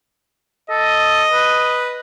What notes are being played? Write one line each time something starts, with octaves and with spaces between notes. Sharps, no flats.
A4 D#5
B4